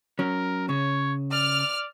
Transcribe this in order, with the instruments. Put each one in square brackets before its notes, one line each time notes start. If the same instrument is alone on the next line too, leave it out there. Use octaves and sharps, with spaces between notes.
[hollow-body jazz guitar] F#3 C#4 [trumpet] A#4
[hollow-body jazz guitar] C#3 [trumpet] C#5
[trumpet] D5 [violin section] F6